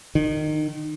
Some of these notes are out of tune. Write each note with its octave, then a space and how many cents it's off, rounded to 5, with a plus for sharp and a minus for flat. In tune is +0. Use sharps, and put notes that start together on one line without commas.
D#3 -25